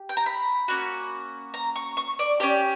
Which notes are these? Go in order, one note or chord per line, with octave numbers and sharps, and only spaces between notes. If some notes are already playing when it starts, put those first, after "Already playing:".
Already playing: G4
G5
A#5
B5
A#3 C#4 F#4
A#5
C#6
C#6
D5
C#4 G4 D5